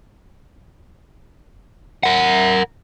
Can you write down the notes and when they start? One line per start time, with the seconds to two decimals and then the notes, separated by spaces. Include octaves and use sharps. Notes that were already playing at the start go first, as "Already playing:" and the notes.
2.03 A#4 F#5